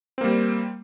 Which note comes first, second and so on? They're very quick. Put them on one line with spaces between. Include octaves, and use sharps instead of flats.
C4 A#3 G3